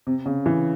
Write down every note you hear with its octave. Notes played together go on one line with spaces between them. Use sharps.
C3
C#3
E3